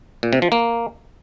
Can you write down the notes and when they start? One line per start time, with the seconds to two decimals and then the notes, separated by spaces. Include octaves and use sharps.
0.23 A#2
0.33 C3
0.42 F3
0.52 A#3